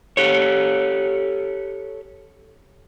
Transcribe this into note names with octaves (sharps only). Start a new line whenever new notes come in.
G4 A4 C#5